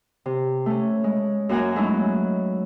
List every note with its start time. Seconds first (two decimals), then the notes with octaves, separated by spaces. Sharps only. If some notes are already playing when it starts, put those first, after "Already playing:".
0.26 C3
0.66 A3 C#4
1.04 G#3
1.49 F#2 A#3 F#4 F#5 G#5 A#5
1.76 F#3 G#3 A3 C#4 D#4 E4